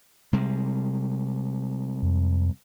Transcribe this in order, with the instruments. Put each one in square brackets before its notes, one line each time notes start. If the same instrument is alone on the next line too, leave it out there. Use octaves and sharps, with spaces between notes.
[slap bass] C3 G3 G#3
[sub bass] F2